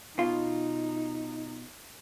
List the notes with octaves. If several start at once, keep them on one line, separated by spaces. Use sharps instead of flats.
B2 D#4 F4